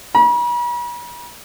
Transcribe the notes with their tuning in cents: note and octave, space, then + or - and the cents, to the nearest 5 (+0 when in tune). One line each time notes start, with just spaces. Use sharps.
B5 -45